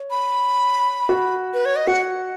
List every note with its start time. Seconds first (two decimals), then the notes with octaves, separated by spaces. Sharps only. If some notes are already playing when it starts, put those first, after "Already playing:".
Already playing: C#5
0.11 B5
1.09 F#4
1.54 B4
1.65 C#5
1.76 D#5
1.87 F#4 F#5